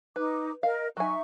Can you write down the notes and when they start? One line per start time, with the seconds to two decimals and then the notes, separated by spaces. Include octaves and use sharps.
0.16 D#4 B4 D6
0.63 A#4 D#5 F5
0.97 F#3 D#4 E5 G#5 C#6